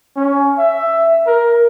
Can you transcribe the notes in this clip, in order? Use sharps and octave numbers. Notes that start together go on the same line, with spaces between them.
C#4
E5
A#4